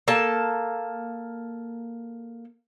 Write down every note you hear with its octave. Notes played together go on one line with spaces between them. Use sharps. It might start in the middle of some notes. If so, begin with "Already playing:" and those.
A#3 A4 A5